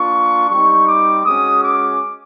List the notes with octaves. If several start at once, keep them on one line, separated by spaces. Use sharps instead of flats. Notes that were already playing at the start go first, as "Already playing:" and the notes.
Already playing: A#3 D4 F4 C#6
G3 C4 D#4 C#6
D6
G#3 C#4 F#4 D#6
D6